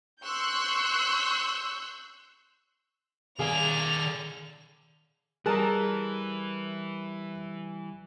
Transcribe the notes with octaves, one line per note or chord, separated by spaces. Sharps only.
C6 C#6 E6 F#6 G6
D#3 G#4 D5 F5 G#5 F7
E3 G3 G#4 A#4 A5 A#5 F#6